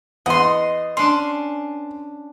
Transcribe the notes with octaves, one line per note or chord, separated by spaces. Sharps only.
E2 D#5 F#5 C6
C#4 D4 C6